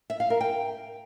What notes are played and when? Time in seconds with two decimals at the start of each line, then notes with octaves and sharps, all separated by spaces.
0.10 E5
0.20 F5
0.30 A#4
0.41 G5